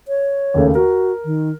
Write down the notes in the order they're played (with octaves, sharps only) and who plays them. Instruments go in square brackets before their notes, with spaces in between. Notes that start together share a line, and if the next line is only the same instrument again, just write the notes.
[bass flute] C#5
[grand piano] D#2 C#3 A3
[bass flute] F#4 [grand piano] A#4
[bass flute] D#3